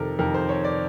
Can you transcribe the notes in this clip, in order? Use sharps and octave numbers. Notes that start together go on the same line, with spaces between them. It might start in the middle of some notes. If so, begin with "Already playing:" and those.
Already playing: F2 C3 D#3 A4 A#4
F2 C3 D#3 A#4
C5
C#5
D5